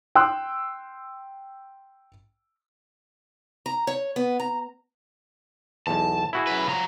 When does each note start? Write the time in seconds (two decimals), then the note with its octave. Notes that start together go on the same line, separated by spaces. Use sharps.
0.15 G5 C6 E6 F#6
3.66 A#5
3.87 C#5
4.16 B3
4.40 A#5
5.87 B1 E2 A5
6.33 E4 F#4 G#4
6.47 F#2 F#3 B4
6.67 F3 F#3 A#5